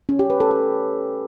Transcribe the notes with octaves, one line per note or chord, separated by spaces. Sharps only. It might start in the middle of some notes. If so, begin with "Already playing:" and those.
C#4
G4
B4
A4
A4